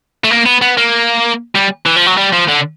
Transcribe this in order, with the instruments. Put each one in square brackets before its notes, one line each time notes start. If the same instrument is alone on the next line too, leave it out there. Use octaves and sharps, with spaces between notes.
[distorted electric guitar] A3
A#3
B3
B3
A#3
G3
E3
F3
F#3
G3
F3
D3